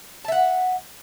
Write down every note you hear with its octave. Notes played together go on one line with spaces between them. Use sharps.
E5 F#5 A5